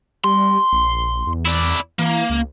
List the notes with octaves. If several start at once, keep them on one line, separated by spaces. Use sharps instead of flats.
G3 C6
A#1
E2
E4 D5
E3 A#3
C#2